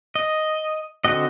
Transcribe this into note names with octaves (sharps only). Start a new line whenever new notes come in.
D#5
D3 C4 F#4 D#5